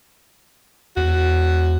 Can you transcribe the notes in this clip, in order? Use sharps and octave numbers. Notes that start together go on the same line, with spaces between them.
E2 F#4